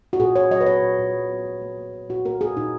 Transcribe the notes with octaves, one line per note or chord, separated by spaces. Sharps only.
F#4
A#2 G#4
A#2 C#5
F#3 D#5
B4
B3 C#5
A#2
A#2
F#3
B3
A#2
A#3
A#3
A#2
A#2 F#4
A#3 A#4
A#3 G#4
A#2 D#4